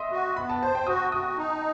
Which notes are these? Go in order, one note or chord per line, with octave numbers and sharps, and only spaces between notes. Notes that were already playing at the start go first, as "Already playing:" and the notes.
Already playing: D#5 E5 C6 D#6
F#4
B3 B5
A5
C5 A5
G5
F#4 D#6
F#4 D#6
D#4